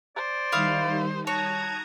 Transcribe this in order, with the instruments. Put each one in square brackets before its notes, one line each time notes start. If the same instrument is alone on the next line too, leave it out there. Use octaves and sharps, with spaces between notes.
[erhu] C5 [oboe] D5
[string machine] D#3 G3 D#4 [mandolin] E4 F5 D#6
[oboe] F#4 [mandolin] C#5 [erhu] A5 [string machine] A#5 D#6 G#6